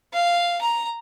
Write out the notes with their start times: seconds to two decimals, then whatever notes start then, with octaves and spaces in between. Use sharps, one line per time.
0.13 F5
0.61 A#5